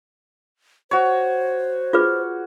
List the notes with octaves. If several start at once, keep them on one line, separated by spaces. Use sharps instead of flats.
F#4 C5 C#5
F4 G#4 B4